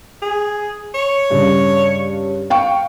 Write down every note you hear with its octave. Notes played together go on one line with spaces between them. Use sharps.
G#4
C#5
G2 C#3
F5 G5 C#6